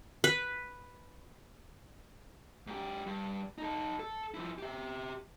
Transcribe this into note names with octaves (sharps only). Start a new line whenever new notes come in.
B4
G#2 G4
G2
D#4 A4
A4
F3 E4
G4 E5